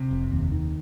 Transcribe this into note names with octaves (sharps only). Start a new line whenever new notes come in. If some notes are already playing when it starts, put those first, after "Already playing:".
Already playing: C3
F1
D#2
D#3